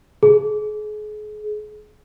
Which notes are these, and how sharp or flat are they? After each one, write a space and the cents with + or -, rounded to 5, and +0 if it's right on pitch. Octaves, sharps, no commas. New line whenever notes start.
G#4 +35